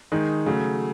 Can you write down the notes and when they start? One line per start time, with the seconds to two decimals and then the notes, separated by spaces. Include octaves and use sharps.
0.12 D#3 G#3 D#4
0.46 C#3 F#3 A3